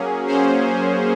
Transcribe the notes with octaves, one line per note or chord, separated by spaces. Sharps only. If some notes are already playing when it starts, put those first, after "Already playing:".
Already playing: F#3 A#3 C#4 G#4
F#3 A#3 C#4 G#4 C5